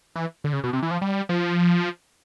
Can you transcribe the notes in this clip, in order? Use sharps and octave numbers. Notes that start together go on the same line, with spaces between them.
E3
D3
C#3
B2
C3
E3
F3
G3
F3